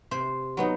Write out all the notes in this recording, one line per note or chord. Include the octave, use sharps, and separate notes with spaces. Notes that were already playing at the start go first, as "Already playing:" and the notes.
C3 C5
F#3 B3 D#4